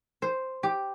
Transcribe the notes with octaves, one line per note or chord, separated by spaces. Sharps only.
C5
G4